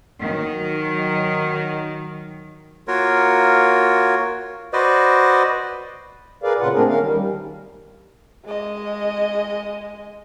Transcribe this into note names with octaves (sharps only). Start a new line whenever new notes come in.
D#3 F#3
A#3 F4 F#4 A#4 C#5
F#4 B4 C5 D5 D#5
G#4 A#4 B4 D5 F5
A#2 C#3 F4 B4 F#5
A3 A#3 C4 D4 G#4 A#4
D#3 C#4 A#4 F5
D#3 G3
G#3 D#5